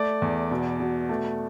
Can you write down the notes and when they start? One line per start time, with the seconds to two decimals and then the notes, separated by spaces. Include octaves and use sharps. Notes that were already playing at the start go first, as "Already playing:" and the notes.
Already playing: A3 D5
0.22 E2
0.51 B2
0.80 B2
1.09 A3